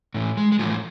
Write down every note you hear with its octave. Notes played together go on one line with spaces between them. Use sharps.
A2 E3
G#3
G#3
A2 E3 F3